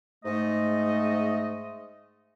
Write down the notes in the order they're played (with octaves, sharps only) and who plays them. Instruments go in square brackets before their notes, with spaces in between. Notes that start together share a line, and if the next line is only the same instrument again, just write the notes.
[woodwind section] G#2 A3 D#5